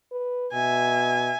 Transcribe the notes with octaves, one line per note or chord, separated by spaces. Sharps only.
B4
B2 E5 G#5